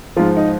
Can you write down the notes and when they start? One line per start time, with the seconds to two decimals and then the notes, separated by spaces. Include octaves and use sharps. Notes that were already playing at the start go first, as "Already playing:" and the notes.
0.16 G#2 F3 F4
0.37 D#4